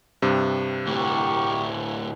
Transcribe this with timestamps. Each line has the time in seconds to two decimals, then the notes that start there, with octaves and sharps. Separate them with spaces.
0.22 G2 C3
0.87 D2 A2 G4 A#4 C#6